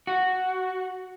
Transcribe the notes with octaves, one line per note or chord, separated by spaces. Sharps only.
F#4